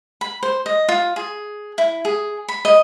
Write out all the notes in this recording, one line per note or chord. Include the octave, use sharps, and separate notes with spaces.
B5
C5
D#5
F4
G#4
E4
G#4
B5
D#5